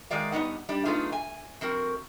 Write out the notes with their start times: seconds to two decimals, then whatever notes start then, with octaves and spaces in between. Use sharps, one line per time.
0.10 D#3 G#3 F#4 D5 F5
0.32 G2 B3 D#4 F#5
0.69 G3 D4
0.85 F#3 A3 B3 D#4 F4 G#4
1.12 G#5
1.61 F2 C4 F#4 A#4